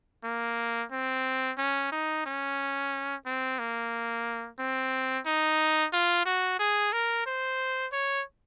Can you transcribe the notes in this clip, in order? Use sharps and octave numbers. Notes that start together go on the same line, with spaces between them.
A#3
C4
C#4
D#4
C#4
C4
A#3
C4
D#4
F4
F#4
G#4
A#4
C5
C#5